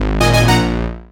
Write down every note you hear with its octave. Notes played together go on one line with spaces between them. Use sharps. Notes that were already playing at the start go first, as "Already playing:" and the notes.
Already playing: G#1
A#2 D#5 G#5
D#5 G#5
A#1 F#5 A#5